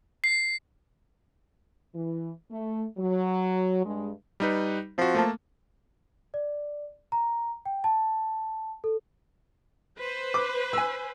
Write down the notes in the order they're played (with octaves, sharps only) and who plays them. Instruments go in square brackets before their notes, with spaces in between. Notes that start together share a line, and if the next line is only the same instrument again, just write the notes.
[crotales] C7
[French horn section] E3
A3
F#3
G2 G#3
[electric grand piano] G3 D#4 B4
[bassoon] F3 [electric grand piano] C4 F#4
[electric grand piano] A3 A#3 A5
[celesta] D5
A#5
G5
A5
A4
[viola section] B4 C5
[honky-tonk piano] D6
G#5 E6